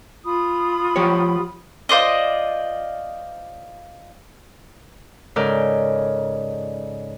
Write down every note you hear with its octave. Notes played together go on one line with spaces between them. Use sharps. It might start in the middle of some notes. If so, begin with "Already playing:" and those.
F4 B5 D#6
F3 G4 C#5
F4 C5 D5 D#5
G#2 C#3 A4 A#4 D5 G6